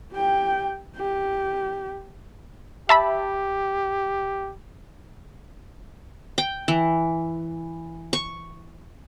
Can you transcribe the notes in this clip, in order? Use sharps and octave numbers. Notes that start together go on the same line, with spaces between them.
G4 G5
G4
G4 E5 A5 B5
G5
E3
C#6